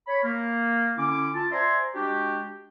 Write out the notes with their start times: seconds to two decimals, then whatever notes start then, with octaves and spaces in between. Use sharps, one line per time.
0.07 C#5 B5
0.24 A#3
0.97 D3 C#4 E4 D6
1.35 F4 A5
1.51 C5 D5 E5 G#5 A#5 C6
1.95 G#3 D4 F#4 G4